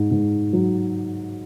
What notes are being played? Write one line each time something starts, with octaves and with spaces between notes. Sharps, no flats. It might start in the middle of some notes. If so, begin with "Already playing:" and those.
Already playing: G#2
G#2
F#3